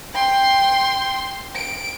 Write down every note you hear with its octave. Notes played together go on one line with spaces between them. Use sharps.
G5 C6
D7